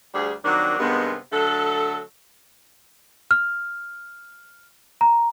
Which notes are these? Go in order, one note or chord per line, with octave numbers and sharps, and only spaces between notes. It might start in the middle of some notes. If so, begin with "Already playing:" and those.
D2 G3 G#4
D#3 F#3 G3 A#3 C4 D4
G2 C3 D#3 G#3 B3
D3 F#3 A3 A4
F6
A#5